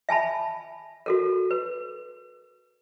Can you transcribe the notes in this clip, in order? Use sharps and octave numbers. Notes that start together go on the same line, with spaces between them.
E5 G#5 A5 B5
F#4 A4 A#4
B4